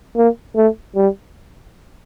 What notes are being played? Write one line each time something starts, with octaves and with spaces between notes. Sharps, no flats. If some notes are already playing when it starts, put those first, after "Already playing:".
A#3
A3
G3